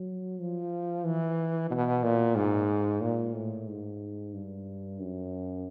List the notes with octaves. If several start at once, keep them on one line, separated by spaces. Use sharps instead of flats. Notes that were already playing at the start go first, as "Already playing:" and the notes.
Already playing: F#3
F3
E3
B2
A#2
G#2
A#2
A2
G#2
G2
F#2